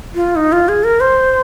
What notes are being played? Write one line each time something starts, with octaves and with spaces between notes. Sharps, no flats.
F4
D#4
F4
G#4
A#4
C5